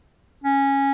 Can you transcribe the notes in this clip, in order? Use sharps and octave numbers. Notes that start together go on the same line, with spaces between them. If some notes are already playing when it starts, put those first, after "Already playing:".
C#4